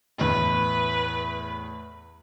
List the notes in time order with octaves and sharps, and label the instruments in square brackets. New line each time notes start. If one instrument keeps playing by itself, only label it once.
[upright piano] E2 A2 [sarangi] B4